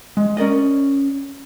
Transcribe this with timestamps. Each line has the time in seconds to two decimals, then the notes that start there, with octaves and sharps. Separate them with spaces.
0.17 G#3
0.37 C#4 A#4 D5 D#5